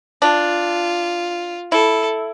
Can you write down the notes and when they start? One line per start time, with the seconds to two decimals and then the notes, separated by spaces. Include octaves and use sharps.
0.21 D4 F4
1.71 E4 A4